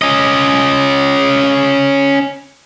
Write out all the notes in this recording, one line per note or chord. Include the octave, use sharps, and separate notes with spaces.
C#4 D#5